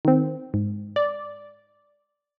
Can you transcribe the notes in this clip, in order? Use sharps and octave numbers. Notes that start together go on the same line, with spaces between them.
D#3 C4
G#2
D5